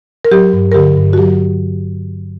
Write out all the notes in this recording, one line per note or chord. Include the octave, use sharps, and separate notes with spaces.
A#4
F#3 G4
G2
A#4
D3 G4
G2
F#4
F#3 G4